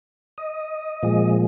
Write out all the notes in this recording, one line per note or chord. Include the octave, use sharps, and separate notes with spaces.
D#5
A#2 F3 G#3